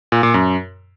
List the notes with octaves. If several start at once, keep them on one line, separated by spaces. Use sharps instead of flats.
A#2
A#2
F#2